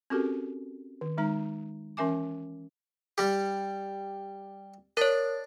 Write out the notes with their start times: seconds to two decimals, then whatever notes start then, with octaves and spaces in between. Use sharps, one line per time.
0.10 C4 C#4 F#4 G4 A4 A#4
1.01 D#3
1.17 D#3 G#3 D#4 A#5
1.97 E3 C#4 A#4 E5 G#5 D6
3.18 G3 G4
4.97 D4 A#4 C#5